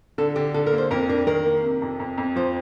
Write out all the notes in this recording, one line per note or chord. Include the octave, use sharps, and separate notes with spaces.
D3 A4
D3 G4
D3 A4
A#4
A#3
C5
F2 A#4
D4 A#4
D#3 A#4
A#3
C3
F2
F2
F2
F3 C5